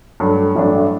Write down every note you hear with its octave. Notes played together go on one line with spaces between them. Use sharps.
G2 F#3 A3
A1 G2 F#3 A3 D4